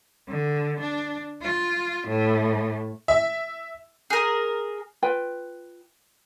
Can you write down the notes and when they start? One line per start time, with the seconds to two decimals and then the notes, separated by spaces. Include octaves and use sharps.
0.28 D3
0.80 D4
1.42 F4
2.07 A2
3.08 E5
4.10 G#4 A#4
5.02 F4 B4 G5